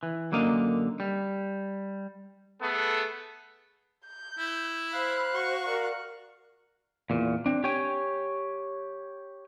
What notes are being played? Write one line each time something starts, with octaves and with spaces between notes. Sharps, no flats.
E3
F#2 D3 A#3 D#5 F5
G3
A3 B3 G#4 A4
G6
E4
C5 F5 B5 F#6
F#4 C#6
A#4 D5 A#5
E2 A#2
C4 D4
G4 C#5 G5 G#5